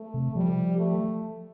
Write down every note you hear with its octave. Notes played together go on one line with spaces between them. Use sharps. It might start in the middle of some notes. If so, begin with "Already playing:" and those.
Already playing: A3
C3
F3 G3
A3